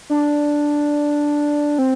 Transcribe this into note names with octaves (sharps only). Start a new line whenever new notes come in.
D4
C4